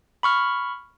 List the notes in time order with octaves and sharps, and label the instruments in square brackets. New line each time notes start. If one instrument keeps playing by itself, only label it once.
[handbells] B5 C#6 F6